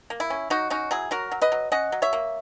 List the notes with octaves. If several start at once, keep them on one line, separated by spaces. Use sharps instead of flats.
A#3
E4
C#4
F#3 D#4 F#4
C#4 D#4 F#4
F#3 E4 G#4
F#3 F#4 A#4
F#3
B4 D#5
F#3
C#4 D#5 F#5
F#3
C#5 E5
A#3